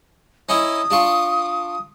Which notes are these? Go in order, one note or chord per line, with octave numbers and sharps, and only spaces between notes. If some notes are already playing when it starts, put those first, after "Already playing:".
C#4 D#4 E4 D#6
D4 F4 C#6